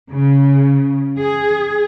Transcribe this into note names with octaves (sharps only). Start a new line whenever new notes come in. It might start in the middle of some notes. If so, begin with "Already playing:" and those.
C#3
G#4